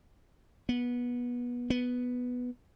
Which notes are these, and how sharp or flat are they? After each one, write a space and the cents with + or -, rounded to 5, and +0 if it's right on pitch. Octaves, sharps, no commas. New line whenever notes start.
B3 -20
B3 +0